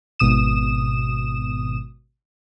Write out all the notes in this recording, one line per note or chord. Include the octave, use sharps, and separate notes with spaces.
G#1 B2 D#6 E7